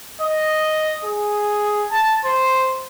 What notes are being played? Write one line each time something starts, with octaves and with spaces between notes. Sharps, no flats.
D#5
G#4
A5
C5